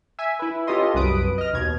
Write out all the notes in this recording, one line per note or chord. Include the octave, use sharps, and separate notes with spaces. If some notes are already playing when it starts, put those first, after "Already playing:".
E5 G#5
E4 B4
C#4 F4 G4 A4 D#5 C6
C2 F#2 B4 D#6 D7
D#5 F6
D#2 B2 G#6